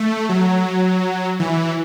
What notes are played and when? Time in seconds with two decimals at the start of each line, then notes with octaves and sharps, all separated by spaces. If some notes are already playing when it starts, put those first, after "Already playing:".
Already playing: A3
0.29 F#3
1.40 E3